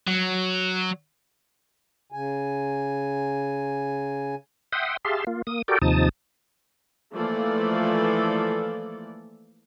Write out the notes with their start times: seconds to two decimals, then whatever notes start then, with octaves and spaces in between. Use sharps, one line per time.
0.08 F#3
2.12 C#3 G#5
4.72 E5 F#5 G5 C6 D#6
5.05 G4 G#4 E5 F5 A5 C6
5.27 A#3 F4
5.47 A#3 D#6
5.68 F#4 G4 A4 A#4 D5 G5
5.82 D#2 C3 F3 D#4 A5 D#6
7.13 E3 F3 A3 A#3 A4 D5